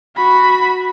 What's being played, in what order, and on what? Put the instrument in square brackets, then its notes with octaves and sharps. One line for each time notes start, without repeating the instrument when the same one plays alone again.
[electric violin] F#4 B5